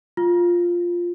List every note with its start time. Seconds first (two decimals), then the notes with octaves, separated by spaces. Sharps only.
0.17 F4